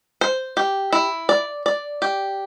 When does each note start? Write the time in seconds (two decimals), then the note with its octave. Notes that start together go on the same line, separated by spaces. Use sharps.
0.21 C5
0.57 G4
0.93 E4
1.29 D5
1.66 D5
2.02 G4